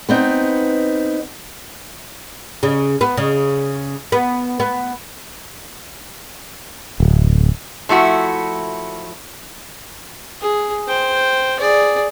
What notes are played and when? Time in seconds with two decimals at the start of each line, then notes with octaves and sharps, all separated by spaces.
0.09 B3 C4 D#4
2.63 C#3
3.01 B3
3.17 C#3
4.12 B3
4.60 B3
7.00 D1
7.89 F3 A3 E4 F#4
10.41 G#4
10.87 C5 G5
11.59 G#4 D5